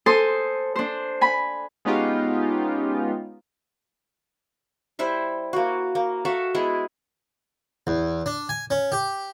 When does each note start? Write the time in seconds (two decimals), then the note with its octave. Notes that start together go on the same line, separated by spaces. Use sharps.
0.06 A4 C5 G#5 C6 D#6
0.76 D4 C5
1.21 G#5 B5
1.85 G#3 B3 C#4 D#4 F4 G4
4.99 G3 E4 C5 E5
5.53 A#3 F#4
5.95 A#3
6.25 F#4 A4 E5 F5
6.54 G#3 B3 E4 G#4
7.87 E2
8.26 D4
8.49 G#5
8.70 C#4
8.92 G4